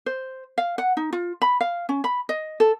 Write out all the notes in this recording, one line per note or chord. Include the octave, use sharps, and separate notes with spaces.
C5
F5
F#5
D#4
F4
B5
F5
C#4
B5
D#5
A4